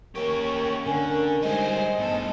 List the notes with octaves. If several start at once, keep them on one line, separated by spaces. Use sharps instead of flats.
A#3 C#4 G4 A#4 C#6
D3 A#4 G#5
G3 G#3 D#4 C5 D#5
G2 B2 A4